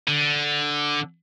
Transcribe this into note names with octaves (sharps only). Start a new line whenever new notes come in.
D3